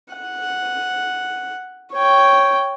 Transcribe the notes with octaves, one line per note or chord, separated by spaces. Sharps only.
F#5
C#5 G5